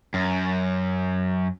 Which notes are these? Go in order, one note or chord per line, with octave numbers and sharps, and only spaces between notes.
F#2